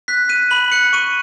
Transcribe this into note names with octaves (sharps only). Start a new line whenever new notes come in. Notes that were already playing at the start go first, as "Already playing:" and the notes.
F#6 B6
F#6 D#7
B5 F#7
F#6 C#7
C#6 D#7